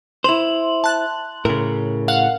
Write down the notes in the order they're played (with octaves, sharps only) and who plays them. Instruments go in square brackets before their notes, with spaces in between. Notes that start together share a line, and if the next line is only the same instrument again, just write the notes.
[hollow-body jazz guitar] E4 C5 [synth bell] C6 F#7
[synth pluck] A5 F#6
[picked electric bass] A2 C#3 [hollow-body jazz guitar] A#4
[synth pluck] F5 F#5